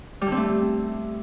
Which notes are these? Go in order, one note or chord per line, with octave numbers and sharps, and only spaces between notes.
G3
D3
C4
A3